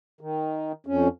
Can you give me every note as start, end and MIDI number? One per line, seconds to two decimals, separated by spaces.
0.21 0.72 51
0.86 1.08 41
0.86 1.08 61